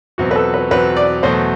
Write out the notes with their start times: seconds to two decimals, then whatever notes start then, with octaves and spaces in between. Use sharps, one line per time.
0.18 E2 B2 F#3 C4 F#4
0.31 B4
0.36 A4
0.54 B4
0.71 E2 B2 F#3 C4 B4
0.97 D5
1.23 E2 B2 F#3 A3 C5